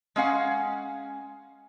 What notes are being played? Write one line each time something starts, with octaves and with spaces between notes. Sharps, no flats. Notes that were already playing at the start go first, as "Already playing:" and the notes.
G#3 C#4 F5 F#5